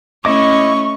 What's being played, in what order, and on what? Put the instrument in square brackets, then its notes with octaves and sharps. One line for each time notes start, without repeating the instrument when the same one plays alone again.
[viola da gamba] A3 C#4 [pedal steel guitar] E4 D#5 D6 [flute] C#6